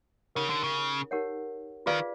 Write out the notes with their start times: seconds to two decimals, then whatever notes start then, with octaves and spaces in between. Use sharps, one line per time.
0.35 C#3 D#4 G4 A#4 C#5 F#5
0.50 D3
0.63 C#3
1.11 D#4 G4 A#4 C#5 F#5
1.86 D#3 F4 G#4 B4 D5 F5